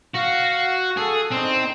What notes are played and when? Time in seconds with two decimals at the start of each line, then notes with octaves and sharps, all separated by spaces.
0.14 F#4 F5
0.97 G#4 A4
1.31 C4 D4 D#4